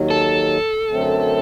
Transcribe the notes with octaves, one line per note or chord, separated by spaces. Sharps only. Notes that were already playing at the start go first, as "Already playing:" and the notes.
Already playing: D#2 D#3 F#3
A4
F#2 D3 F#3 A3 C4